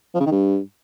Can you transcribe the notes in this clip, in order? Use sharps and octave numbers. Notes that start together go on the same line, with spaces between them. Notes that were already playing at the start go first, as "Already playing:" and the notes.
F3
C#3
D#3
G2